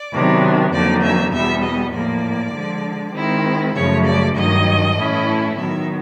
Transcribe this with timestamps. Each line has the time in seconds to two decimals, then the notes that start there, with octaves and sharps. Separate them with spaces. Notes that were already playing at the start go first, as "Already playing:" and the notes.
Already playing: D5
0.12 C3 D#3 F#3 B3 D4
0.72 F2 D3 F#3 A#3 D#4 D5
1.03 E5
1.33 E2 B2 G3 B3 E5
1.63 D#5
1.94 A2 F3 A#3 D5
2.54 D3 F3 G#3
3.15 D#3 G#3 C4 E4
3.75 F#2 C#3 F3 A3 C#5
4.06 D5
4.36 G2 D#3 F#3 D#5
4.97 A2 E3 A3 C#4 E4
5.57 D#3 F#3 B3 E5